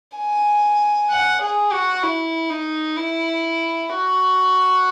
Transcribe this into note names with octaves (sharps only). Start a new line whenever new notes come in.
G#5
F#5
G#4
F#4
E4
D#4
E4
F#4